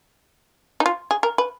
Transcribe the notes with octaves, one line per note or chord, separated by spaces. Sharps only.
D#4
F4
G#4
A#4
B4